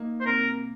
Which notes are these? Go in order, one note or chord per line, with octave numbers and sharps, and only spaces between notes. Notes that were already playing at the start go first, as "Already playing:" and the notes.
Already playing: A#3 D#4
C5
C3 A#4